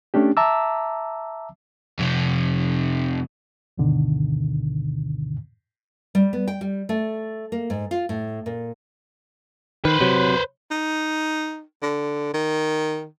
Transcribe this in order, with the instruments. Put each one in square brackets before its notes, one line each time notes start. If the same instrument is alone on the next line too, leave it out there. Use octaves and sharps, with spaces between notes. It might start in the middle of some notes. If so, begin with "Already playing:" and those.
[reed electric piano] A3 C#4 D4 G4
E5 A5 A#5 D6 E6
[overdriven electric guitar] F2 C3
[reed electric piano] D2 G2 B2 D3 D#3
[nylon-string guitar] G3
B3
G5
G3
A3
A#3
G#2
F4
A2
A#2
[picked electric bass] D#3 [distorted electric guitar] B4 C5
[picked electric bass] C3 F#3
[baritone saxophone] D#4
D3
D#3